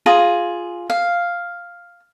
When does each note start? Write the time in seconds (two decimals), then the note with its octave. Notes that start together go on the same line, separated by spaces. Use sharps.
0.06 F4 G#4 A#5
0.90 F5